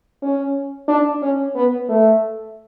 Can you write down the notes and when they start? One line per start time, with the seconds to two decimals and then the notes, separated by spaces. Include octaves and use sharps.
0.22 C#4
0.88 D4
1.22 C#4
1.55 B3
1.89 A3